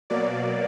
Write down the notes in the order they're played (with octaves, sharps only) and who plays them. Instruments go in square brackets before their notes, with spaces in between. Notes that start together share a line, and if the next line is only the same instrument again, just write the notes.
[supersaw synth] B2 F#3 A#3 D5